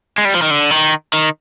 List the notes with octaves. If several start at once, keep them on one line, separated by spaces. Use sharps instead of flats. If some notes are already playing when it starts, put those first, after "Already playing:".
G#3
G3
F3
D#3
D3
D#3
D#3